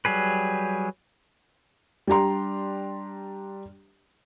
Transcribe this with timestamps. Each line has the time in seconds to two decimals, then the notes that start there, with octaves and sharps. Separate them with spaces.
0.05 F#3 G3 G#4 B4
2.07 G3 D4 G4 A#5 C6